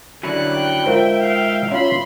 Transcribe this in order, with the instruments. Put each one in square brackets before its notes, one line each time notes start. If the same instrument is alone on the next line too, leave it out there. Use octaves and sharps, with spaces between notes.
[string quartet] D3 G3 F#6 [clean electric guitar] F#3 C#4 E4
[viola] G5
[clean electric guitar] G#2 [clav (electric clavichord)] F4 A#4 C5 [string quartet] E5
[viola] F5 G5
[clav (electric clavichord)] C#4 F4 [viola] B5 C6